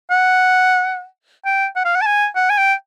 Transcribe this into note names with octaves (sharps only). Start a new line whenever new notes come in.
F#5
G5
F#5
F5
F#5
A5
G#5
F#5
G#5
G5